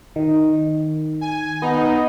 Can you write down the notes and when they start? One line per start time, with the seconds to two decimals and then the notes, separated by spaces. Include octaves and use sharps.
0.16 D#3
1.21 G#5
1.62 B3 D#4